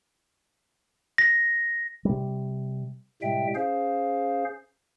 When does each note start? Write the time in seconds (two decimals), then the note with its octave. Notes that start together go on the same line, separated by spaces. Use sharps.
1.18 A#6
2.05 C3 G3
3.22 A2 C3 G3 G#3 E5 G5
3.55 C#4 G#4 C5 F5